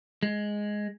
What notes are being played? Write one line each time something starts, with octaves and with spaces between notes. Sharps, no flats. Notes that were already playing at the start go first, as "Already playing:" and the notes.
G#3